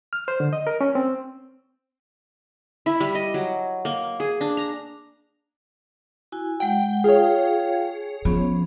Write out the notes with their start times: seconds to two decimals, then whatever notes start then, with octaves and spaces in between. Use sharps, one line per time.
0.13 F6
0.28 C5
0.40 D3
0.53 D#5
0.67 A#4
0.81 C#4
0.95 C4
2.86 E4
3.00 G3
3.15 D#5
3.34 F#3
3.85 A#3
4.20 G#4
4.41 D4
4.57 A#5
6.32 E4 F#4 G#5
6.60 G#3 F#5 G5
7.04 F4 G#4 C#5 F5 G5
8.25 F3 B3 C#4